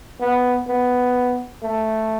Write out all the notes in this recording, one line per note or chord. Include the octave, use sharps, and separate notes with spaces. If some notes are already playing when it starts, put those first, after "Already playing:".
B3
B3
A3